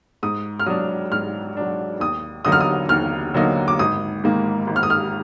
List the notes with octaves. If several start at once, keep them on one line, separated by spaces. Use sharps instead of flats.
G#2 D#6
F6
F#3 D4 D#6
G#2 F6
F#3 D4
D#2 D#6
D3 F#3 A#3 D#4 D#6
F6
D#6
D#2 F6
D3 F#3 A#3 D#4
D6
G#1 D#6
G#2 D#3 A#3
G#1
F6
D#6
F6